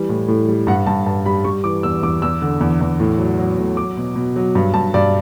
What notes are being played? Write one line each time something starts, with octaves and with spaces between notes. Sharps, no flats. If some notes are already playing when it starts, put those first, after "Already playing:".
Already playing: E3 G3
A2
A2
G3
G2 F#5
G2 A5
G2 A5
G3 B5
G3 C#6
E3 D6
E2 E6
E2 D6
E2 E6
D3
E2
E2
A2
F#3
F#3
A2
F#3 D6
B2
B2
F#3
G2
G2 A5
G2 D5